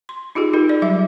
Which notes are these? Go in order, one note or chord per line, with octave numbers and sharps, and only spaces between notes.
C6
D#4 F4 G4 G#4
D#4 G4 A#4
D5
F#3 G3 D5 E5